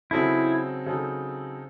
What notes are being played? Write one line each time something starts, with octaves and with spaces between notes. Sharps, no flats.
C#3 F#3 C4 D#4 E4 A4
C#3 F#3 C4 D#4 A4